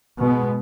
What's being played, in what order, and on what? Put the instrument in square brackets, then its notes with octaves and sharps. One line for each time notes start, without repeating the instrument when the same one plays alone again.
[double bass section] B2 G#3 B3